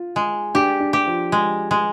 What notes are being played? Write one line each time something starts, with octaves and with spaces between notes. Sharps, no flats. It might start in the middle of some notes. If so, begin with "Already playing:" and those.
Already playing: F4
G#3
D4 G4
D4
G4
F3
G#3
G#3